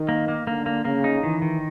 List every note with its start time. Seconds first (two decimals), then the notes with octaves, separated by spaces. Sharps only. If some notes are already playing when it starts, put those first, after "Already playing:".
Already playing: D#3
0.09 A#3
0.28 A#3
0.47 D3 A#3
0.66 A#3
0.85 C#3 A#3
1.04 D#4
1.23 D#3 E3
1.42 D#3